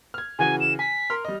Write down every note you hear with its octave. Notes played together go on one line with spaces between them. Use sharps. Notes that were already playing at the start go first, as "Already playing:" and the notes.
F6 G#6
C#3 E3 F#4 G#5
E7
G#5 B6
A#4 C6 F6
G3 D#5